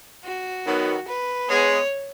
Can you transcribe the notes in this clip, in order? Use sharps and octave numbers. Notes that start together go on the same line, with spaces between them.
F#4
D#3 F#3 B3
B4
G#3 B3 G#4 C#5